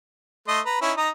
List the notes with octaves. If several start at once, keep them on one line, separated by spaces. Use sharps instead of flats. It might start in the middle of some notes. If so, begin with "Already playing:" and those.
A3 D#5 C6
B4 A#5
C#4 D#4 E4
D#4 A#5 D#6